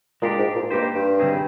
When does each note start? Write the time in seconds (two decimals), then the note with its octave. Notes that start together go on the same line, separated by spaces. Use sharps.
0.22 A#2 G#3 D4 G4
0.38 G#2
0.55 A#2
0.71 G2 A#3 D#4 G4 C5
0.95 G2
1.19 D3 G3 C4 D#4 G#4